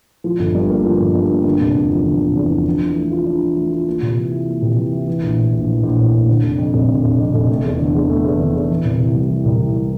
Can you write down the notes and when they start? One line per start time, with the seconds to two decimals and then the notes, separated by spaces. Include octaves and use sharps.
0.24 F3
0.39 G1
0.55 G2
0.70 A#3
0.85 F3
1.00 G1
1.15 G2
1.30 A#3
1.45 D3
1.61 F1
1.76 E2
1.91 F3
2.05 D3
2.20 F1
2.36 E2
2.51 F3
2.66 D4
2.81 E3
2.96 A3
3.11 F4
3.26 D4
3.41 E3
3.57 A3
3.72 F4
3.86 A#3
4.02 C3
4.17 E3
4.32 E4
4.47 A#3
4.62 C3
4.77 E3
4.93 E4
5.07 E3
5.23 A#1
5.38 A2
5.53 A#1
5.68 E3
5.83 A#1
5.98 A2
6.13 A#1
6.29 D3
6.43 F1
6.58 F2
6.74 F1
6.89 D3
7.04 F1
7.19 F2
7.34 F1
7.49 A3
7.64 E2
7.80 D3
7.95 E2
8.10 A3
8.25 E2
8.40 D3
8.55 E2
8.70 E3
8.85 C2
9.00 C3
9.16 G3
9.30 E3
9.45 C2
9.61 C3
9.76 G3